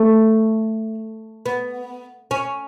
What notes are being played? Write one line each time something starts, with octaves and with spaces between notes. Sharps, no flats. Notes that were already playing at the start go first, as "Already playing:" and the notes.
Already playing: A3
B3
C#4